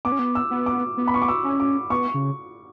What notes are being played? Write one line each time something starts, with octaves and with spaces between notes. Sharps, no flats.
B3 D6
C#4
B3
E6
B3
D6
B3
B5
C#6
D6
E6
C#4
D6
B3 C#6
C#3